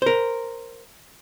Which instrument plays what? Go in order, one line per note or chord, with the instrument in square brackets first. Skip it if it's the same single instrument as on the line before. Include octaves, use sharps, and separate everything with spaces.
[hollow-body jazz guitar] A#4 C5